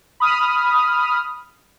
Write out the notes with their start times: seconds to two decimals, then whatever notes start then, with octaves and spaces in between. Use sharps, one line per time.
0.20 B5 D#6 F6